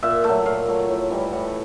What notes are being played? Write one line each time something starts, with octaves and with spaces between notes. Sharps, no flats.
A#2 E5
F#3 A3
A#2 F5
F#3 A3
A2
E3 G3
A2 F#5